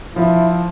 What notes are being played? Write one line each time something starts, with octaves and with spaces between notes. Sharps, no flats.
F3 E4